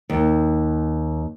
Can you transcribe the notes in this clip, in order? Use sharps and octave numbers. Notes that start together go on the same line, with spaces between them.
D#2